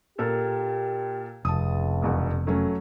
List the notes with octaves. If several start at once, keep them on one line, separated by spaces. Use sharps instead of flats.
A#2 G4 A4 A#4
F1 C#2 A5 D#6
E1 E2 F#5
F#3 A3 C#4 A4